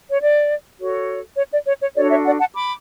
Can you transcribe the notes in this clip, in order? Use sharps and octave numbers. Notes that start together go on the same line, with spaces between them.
C#5
D5
F#4 A4 C#5
C#5
D5
C#5
C#5
D4 F#4 A4 C#5 D5
C#5 E5
D5 F#5
F#5 A5
B5 D6